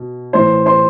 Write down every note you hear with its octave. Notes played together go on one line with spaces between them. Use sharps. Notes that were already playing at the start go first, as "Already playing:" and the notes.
Already playing: B2
A2 E3 A3 C5 C6
C5 C6